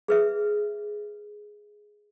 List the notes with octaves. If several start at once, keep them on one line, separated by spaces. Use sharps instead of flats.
G#4 B4 E5